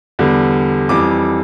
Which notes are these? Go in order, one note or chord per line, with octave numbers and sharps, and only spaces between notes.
E2 D3 G3
F2 E3 G3 D6